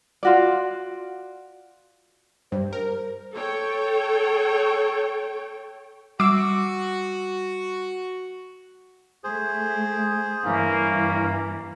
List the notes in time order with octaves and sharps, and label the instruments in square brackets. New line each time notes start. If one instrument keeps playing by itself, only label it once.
[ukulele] F4 F#4 D5
[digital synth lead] G2 [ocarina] C5
[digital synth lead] A#4
[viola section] A4 C#5 G5
[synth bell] G3 C7 D7 [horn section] F#4 [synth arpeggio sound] D6 E6
[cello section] A3 [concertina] G#4 C5
[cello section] G2 E3 [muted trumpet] A#3 [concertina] C#4